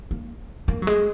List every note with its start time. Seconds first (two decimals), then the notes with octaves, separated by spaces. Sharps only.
0.11 A#3
0.68 A#3
0.82 F#3
0.87 G#3